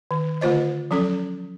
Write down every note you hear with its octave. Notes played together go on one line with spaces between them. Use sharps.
D#3
D3 A3 F4 C5 D#5
F3 F#3 C#4 A4